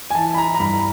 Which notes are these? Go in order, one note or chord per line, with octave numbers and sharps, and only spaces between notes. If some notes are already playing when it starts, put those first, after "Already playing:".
G#5
E3 A5
B5
A#5
A#5
G2 B5